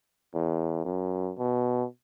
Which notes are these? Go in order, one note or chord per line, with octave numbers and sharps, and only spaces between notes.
E2
F#2
B2